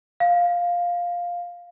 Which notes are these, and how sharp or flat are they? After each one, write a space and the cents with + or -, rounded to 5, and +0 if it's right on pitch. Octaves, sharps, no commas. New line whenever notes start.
F5 +5